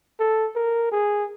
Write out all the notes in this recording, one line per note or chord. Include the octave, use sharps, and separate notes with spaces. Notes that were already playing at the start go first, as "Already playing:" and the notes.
A4
A#4
G#4